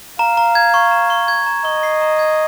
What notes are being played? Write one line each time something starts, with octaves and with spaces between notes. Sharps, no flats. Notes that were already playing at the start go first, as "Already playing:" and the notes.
F5 A#5
A#5
G#6
C#6
A#5
C#6
G#6
A#5
D#5 C#6
C7
A#5
G#6